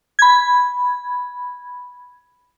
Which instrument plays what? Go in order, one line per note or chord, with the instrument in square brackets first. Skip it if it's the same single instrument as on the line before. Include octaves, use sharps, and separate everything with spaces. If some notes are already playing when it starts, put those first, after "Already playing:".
[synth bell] B5 G#6